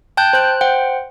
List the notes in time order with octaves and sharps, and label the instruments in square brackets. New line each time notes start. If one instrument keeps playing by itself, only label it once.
[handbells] G5 A5 F#6 G6
C5 F#6
C5 F#5 G5